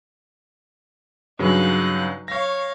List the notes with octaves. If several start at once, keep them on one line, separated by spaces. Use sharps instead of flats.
G2 C#3 F#3 D#4 F#6
C#5 F5 C#6 A#6